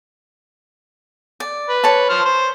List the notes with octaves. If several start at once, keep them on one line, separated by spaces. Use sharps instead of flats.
D5
B4
C#5 A5
C5 F6
C5